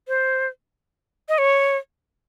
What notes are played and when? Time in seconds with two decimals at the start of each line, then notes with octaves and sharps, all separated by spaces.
0.08 C5
1.29 D#5
1.38 C#5